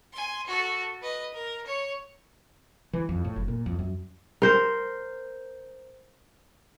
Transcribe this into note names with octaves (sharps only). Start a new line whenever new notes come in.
G#5 C6
F#4 A4
B4 D#5
A#4
C#5
E3
F2
A2
F#1
A#2
F2
F#2
A#4 C5